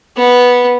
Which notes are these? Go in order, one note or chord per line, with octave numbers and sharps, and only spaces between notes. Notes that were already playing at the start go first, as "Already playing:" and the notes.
B3